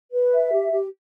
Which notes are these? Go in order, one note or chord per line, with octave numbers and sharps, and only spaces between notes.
B4
E5
G4
G4